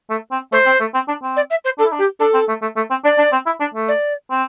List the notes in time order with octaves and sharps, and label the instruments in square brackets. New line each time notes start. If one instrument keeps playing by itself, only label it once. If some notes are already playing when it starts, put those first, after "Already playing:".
[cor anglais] A3
C4
[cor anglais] A3 [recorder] C5
[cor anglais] C4
A3
C4
D4
C4
[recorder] D5
E5
C5
[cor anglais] D4 [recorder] A4
[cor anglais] E4
D4
[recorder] G4
[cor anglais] D4 [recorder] A4
[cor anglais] C4
A3
A3
A3
C4
[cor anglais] D4 [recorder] D5
[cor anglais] D4
C4
E4
D4
A3
[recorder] D5
[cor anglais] C4